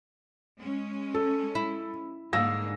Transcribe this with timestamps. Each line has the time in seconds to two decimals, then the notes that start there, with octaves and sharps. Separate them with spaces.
0.59 G#3 C#4
1.14 A4
1.55 E4
2.33 G#2 D3 A#3 F5 E6 A#6